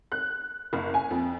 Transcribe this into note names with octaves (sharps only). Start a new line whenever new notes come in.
F#6
F#1
G#5
F2